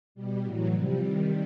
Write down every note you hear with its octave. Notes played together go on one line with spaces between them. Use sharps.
B2 G3
A2 E3 F#3
C3 F3 G3
C3 D#3